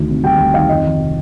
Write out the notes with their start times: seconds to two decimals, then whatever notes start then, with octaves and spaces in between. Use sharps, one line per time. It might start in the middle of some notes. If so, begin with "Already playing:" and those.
Already playing: D2 D#3
0.09 C3
0.23 G3 G5
0.39 D2
0.54 D#3 F5
0.69 F2 D#5
0.84 D#3
1.00 C3